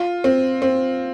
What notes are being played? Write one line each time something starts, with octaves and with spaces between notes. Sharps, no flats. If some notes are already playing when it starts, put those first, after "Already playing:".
Already playing: F4
C4
C4